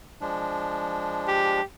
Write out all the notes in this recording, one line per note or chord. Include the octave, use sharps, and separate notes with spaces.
F3 G#3 D4
G4